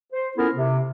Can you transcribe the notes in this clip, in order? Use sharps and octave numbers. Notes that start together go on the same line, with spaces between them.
C5
B3 C#4 E4 F4 A4 A#4
C3